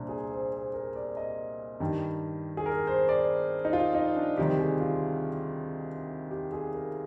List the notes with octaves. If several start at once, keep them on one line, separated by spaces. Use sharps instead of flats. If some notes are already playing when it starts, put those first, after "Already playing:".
Already playing: C2 A#2 G3 C4 D4
G#4
C5
C5
A#4
D5
D#5
G2 D#3 G3
G#4
A#4
C5
D5
D#4
F4
D#4
D4
D2 C3 D#3 G3 G4
G#4
F4
G4
G#4
A#4